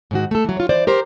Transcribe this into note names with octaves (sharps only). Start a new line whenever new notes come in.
G#2 D#3 F#4
A3 A4
E3 F#3
F4 C#5
E3 C5 D5
G4 A#4 C5